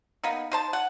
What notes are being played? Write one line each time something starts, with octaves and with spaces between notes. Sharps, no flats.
A#3 B3 D#4
D#4 C5 A5
F#5